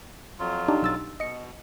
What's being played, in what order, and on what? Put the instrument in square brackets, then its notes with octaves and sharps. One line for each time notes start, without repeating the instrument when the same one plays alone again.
[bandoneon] F2 F#3 F4
[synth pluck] D4 D#4 G4
B1 E6 A6
[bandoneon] B2 [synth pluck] D#5 C#7